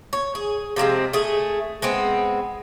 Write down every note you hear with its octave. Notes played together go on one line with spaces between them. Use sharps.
C#5
G#4
C3 F3 G#3 C4
A3 G#4
G#3 B3 C4